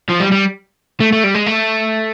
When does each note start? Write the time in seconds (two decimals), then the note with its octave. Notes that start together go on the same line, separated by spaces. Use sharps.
0.09 F3
0.20 G3
0.32 G3
1.00 A3
1.12 A3
1.24 G3
1.34 G#3
1.46 A3